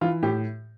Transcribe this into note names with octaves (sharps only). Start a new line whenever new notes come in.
E3 F4
A2 G4